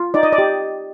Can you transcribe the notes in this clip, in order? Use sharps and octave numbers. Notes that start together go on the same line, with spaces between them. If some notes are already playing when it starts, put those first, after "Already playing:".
Already playing: F4
D#4 D5
D#5
D5
G4